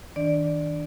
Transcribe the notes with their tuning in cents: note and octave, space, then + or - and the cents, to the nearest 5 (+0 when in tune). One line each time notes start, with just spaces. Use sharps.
D#3 +30 D4 +0 D5 +0